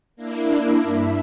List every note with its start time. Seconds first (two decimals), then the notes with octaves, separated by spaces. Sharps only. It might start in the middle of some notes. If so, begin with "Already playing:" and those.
0.16 A#3 D4 E4
0.82 G2 E5